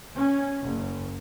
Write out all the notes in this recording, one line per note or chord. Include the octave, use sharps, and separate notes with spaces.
C#4
F#1